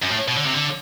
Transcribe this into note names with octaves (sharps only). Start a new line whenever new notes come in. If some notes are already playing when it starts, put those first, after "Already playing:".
F#2
A2
B2
D3
C3
D3